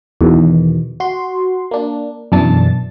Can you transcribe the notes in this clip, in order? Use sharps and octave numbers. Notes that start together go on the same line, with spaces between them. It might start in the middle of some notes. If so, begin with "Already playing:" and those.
E2 B2 D#3
F#4 C6
A#3 D4
F#2 B2 E3 D4 A5 A6